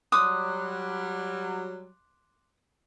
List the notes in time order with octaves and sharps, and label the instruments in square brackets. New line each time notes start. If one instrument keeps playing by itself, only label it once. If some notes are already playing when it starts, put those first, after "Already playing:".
[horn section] F#3 G3 [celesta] C6 D6 F#6 [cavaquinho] D#6